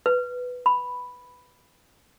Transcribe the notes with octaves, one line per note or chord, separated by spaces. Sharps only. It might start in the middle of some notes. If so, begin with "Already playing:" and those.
B4
B5